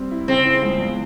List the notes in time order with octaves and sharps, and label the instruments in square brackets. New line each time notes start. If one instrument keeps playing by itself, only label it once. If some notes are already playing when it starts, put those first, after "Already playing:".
Already playing: [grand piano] G3 C4
E4
[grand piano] C#3 [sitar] C4
[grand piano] E3
C#2
E2